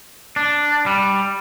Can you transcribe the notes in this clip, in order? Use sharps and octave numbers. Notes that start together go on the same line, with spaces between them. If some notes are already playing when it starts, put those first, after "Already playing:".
D4
G3